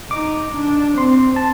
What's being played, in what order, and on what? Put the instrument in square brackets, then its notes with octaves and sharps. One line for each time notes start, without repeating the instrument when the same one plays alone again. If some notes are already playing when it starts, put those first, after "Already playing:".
[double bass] D#4 [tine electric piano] D6
[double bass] D4
[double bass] C4 [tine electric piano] C6
[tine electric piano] A5